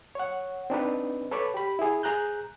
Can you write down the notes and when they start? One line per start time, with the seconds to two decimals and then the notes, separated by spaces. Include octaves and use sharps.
0.15 C#5 F#5
0.70 C4 D4 D#4 B4
1.31 A4 B4 C#5 B5 D6
1.54 G4 B5
1.79 E4 G#4
2.03 G#4 A#5 F#6 G6